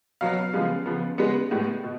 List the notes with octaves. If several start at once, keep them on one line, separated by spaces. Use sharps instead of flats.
B2 F#3 B3 F5
C#3 F3 G#3 B3
C#3 F3 B3
C#3 G#3 B3
A2 G#3 B3
B2